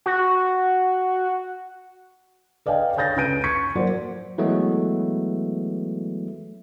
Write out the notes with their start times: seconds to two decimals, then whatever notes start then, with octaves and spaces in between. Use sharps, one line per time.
0.06 F#4
2.66 B4 D5 D#5 F5 G5 G#5
2.96 C#5 F5 G#5 G6 A6 A#6
3.16 C#2 B4 G6 D7 D#7
3.44 C#6 G#6 B6 C#7
3.75 F#3 A#3 C5 D5
4.38 E3 F#3 G#3 A3 B3